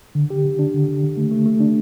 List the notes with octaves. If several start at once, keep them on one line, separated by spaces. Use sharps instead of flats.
D3
G4
D3
D4
D3
D3
D3
A3
A3
A3
D4